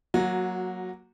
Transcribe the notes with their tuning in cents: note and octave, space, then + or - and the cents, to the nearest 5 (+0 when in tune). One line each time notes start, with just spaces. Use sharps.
F#3 +0 A#3 +0 F#4 -20